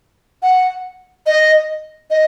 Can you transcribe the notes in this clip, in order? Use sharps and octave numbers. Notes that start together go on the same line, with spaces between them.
F#5
D#5
D#5